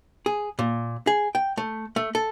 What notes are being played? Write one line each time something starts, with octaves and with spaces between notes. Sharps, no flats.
G#4
A#2
G#4
G5
A3
A3
A4